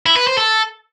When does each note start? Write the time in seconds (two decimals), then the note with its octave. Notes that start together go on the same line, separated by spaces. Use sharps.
0.06 E4
0.17 B4
0.27 C5
0.38 A4